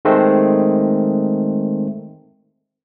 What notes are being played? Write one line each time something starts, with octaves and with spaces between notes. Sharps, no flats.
D#3 G#3 A3 C4